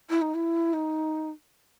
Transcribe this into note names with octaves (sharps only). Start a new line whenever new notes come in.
E4
D#4
E4
D#4